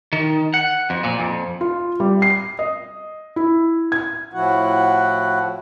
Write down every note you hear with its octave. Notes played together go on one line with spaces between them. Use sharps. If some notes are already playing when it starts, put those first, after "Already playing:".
D#3
F#5
F2
A#2
F2
F4
G3
C7
D#5
E4
G#6
A2 F3 E4 F#4 F#5